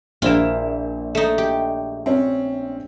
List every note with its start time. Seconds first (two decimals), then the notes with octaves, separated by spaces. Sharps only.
0.22 A#1 A#3 E4 F4 C5 E7
1.15 A3 D#4
1.38 G4
2.06 C4 C#4